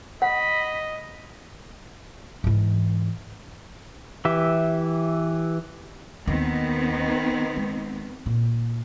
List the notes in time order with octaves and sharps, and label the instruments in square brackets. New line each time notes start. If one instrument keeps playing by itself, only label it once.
[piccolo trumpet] D#5 [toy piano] F#5 [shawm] B5
[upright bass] G#2 E3
[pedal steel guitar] E3 G4 E5
[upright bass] D#2 D#4 [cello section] D#3 B3 C4
[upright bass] G#3
A#2